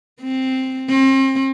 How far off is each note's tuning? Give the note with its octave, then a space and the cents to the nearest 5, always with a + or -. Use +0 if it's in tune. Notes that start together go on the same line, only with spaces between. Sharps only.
C4 +0
C4 +35